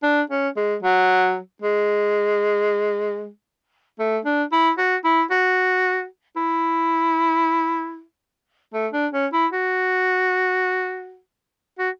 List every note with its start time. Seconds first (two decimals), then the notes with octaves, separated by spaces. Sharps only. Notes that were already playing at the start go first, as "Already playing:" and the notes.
0.03 D4
0.30 C#4
0.57 G#3
0.83 F#3
1.62 G#3
3.99 A3
4.25 D4
4.52 E4
4.78 F#4
5.04 E4
5.31 F#4
6.36 E4
8.74 A3
8.93 D4
9.13 C#4
9.33 E4
9.52 F#4
11.79 F#4